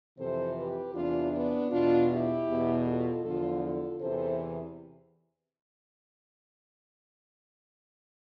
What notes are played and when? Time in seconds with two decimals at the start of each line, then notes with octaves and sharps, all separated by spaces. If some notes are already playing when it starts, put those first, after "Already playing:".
0.18 F2 C3 E3 A4 C5
0.57 G4 B4
0.94 E2 C3 E3 D4 F4
1.32 B3 D4
1.71 E2 B2 D4 F4
2.09 E4 G4
2.47 E2 B2
2.85 F4 A4
3.23 E2 D3 F3 F4 A4
3.62 F4 A4
4.00 E2 C3 E3 A4 C5